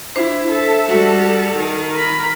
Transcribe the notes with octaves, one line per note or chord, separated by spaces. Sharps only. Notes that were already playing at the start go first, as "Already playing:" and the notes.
D4 E4 C5
A4 E5
G3 F#4 A4
D#3
A#4 B5